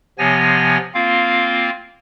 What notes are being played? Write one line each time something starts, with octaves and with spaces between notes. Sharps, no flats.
C3 F3 B3 C#5 G#5 A#6
A#3 C4 F4 F5